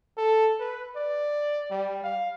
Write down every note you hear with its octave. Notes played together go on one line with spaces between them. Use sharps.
A4
B4
D5
G3
F5